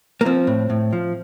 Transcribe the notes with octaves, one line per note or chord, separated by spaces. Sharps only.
A#3
F3 C4
A2
A2
F3